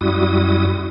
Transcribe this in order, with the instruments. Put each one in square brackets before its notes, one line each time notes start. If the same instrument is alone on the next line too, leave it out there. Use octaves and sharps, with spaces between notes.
[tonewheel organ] F#2 G3 E4 F#4 D#6